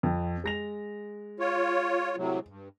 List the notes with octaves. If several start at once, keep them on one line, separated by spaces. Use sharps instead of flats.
F2
G#3 A#6 F7
F4 C#5
A2 C3 F#3
G2